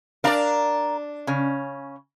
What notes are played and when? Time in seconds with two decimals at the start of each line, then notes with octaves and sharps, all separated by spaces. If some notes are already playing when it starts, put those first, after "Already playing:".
0.24 D4 A#4 D5 F5 A#5
1.27 C#3 C#4